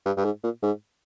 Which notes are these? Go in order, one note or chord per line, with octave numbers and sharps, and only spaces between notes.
G2
G2
G#2
A#2
G#2